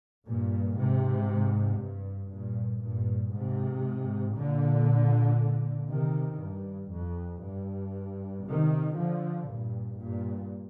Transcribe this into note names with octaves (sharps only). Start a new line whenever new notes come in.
G2 A#2
G#2 C3
G2
G2 A#2
G2 A#2
G#2 C3
A#2 D3
C3 D#3
G2
F2
G2
C3 D#3
D3 F3
G2 A#2
G2 A#2